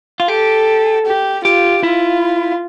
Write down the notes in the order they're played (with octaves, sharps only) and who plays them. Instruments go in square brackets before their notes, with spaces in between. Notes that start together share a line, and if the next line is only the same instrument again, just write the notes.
[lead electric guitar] F4
[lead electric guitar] G4 [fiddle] A4
[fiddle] G4
[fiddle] F4 [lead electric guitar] G4
[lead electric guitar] E4 [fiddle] F4